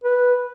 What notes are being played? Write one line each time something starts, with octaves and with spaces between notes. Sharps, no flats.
B4